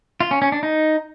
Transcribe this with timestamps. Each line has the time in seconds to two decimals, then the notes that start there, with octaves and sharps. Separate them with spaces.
0.21 F4
0.31 C#4
0.42 C#4
0.52 D4
0.63 D#4